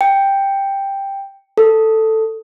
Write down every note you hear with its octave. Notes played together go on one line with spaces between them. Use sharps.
G5
A4